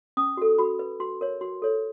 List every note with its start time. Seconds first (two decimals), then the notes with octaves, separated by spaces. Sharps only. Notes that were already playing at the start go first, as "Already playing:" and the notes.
0.17 C#4 D#6
0.37 F#4 A4
0.58 F#4 B5
0.79 B4
1.00 F#4 C6
1.21 A#4 C#5
1.41 F#4 C6
1.62 A4 C#5